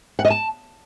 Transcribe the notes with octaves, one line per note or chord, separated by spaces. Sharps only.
F#5
D#5
A5